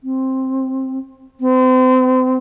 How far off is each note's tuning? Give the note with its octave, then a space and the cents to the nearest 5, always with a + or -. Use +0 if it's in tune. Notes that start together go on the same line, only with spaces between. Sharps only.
C4 +10
C4 -35